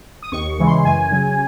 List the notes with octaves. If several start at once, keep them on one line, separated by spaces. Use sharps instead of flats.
D#6
D#2 C#6
C#6
C#3 E3 G#3
C6
F#2 G#5
C#3 F#3